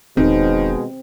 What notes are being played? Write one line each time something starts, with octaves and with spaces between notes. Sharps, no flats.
E1 B2 D#3 G#3 C4